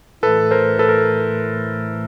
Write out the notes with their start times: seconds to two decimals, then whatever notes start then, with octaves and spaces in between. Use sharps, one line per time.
0.23 A2 E3 A3 A4 B4
0.51 A#4 C5
0.79 A4 B4
0.89 A#4